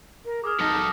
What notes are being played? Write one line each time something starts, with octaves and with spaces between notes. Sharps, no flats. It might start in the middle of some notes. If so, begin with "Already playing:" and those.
A#4
G#4 D6 D#6 F6
F#3 D#4 A4 F6 A#6 B6